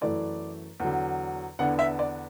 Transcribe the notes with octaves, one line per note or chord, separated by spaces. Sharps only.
F#2 E3 A3 D5
E2 D3 F#3
E2 D3 B3 D4 F#5
E5
D5